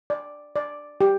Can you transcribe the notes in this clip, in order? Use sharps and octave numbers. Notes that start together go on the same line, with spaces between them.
D5
D5
G4